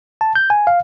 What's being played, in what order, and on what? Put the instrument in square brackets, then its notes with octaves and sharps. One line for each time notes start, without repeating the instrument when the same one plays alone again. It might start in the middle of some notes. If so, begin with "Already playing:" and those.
[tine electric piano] A5
G6
G#5
F5